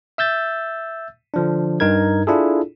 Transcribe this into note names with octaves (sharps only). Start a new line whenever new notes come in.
E5 E6 G6 A6
D3 F3 D4
G2 D#4 A#4 G#6
D4 E4 F4 G#4 A4